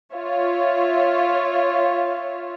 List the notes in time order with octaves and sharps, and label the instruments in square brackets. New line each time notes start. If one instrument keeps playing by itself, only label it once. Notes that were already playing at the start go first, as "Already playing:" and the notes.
[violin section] F4 C#5 E5 F5